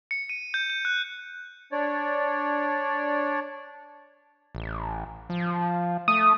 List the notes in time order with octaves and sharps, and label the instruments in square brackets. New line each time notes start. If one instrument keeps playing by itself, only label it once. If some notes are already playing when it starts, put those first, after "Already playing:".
[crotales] C#7
D#7
G6
G6
F#6
[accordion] D4 C#5 D5
[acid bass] A1
F3
[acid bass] A3 [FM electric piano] D#6